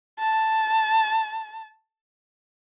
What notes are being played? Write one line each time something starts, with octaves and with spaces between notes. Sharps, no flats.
A5